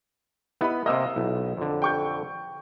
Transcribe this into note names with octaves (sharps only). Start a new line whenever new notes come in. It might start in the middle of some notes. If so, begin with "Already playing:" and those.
B3 E4 D#5 B5
C3 A#3 D#5 F5 E6
B1 E4
F2 D3
G5 C#6 G6